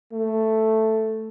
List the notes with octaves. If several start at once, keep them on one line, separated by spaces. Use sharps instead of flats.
A3